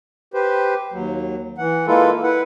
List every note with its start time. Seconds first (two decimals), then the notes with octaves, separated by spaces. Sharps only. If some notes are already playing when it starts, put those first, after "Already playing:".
0.34 G4 B4 C5
0.92 D#2 F#3
1.58 E3 F#5
1.87 G#3 A#3 E4 F4 A4 B4
2.23 E4 B4 F#5